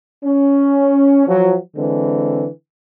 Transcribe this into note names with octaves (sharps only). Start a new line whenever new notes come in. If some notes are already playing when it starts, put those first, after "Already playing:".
C#4
F3 F#3
D3 E3 G#3 C4